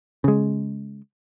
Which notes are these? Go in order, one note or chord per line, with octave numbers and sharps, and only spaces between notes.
C#3 G#3